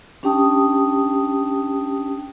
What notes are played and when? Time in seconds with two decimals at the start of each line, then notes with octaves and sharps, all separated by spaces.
0.23 C#4 D4 G4 G5 A5 D#6